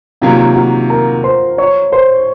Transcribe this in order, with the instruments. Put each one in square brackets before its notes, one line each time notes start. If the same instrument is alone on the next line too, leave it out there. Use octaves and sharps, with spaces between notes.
[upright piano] C3 D#3 F#3 A#3 [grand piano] F4 F5
[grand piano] F#4 F#5
A#4 A#5
C5 C6
C#5 C#6
C5 C6